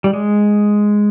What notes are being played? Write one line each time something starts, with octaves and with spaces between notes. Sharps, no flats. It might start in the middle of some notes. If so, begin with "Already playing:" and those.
G3
G#3